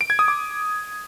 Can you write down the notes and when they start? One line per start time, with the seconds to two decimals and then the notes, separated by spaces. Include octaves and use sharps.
0.01 D7
0.10 G#6
0.19 D#6
0.28 D6